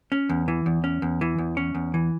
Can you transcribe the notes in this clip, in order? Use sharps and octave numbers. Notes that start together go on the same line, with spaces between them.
C#4
E2
E3
E2
C#4
E2
E3
E2
C#4
E2
E3